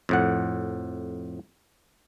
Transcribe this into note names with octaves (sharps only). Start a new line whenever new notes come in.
F2 A2 F#5